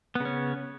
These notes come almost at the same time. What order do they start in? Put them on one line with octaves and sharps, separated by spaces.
B3 C#3 C#4